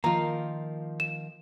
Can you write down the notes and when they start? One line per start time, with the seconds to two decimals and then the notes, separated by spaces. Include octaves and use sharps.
0.04 D#3 F3 A#3 F4 F5 A#5
1.00 E7